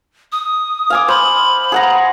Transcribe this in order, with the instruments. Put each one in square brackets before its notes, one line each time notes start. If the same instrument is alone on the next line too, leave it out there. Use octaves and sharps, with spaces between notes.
[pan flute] D#6
[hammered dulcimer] F5 G#5 D6
[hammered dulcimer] C5 [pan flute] B5
[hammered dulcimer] G#4 F#5 A#5